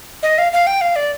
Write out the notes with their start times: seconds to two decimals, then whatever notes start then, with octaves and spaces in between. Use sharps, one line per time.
0.23 D#5
0.38 F5
0.53 F5
0.67 G5
0.81 F5
0.96 D5